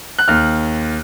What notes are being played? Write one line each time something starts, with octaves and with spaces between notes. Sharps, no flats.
F#6
D#2 F6